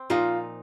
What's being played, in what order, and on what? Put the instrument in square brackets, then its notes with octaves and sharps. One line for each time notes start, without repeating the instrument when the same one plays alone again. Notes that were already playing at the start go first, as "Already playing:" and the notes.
Already playing: [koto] C4
[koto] A#2 F3 A#3 D#4 [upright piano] F4